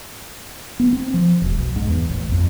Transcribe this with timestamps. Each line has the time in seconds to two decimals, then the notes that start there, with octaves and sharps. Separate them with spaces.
0.80 B3
0.93 C4
1.14 F3
1.42 E1
1.56 B1
1.76 G#2
1.88 E2
2.09 A1
2.32 F2